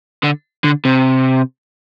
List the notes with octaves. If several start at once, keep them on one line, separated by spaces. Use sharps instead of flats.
D3
D3
C3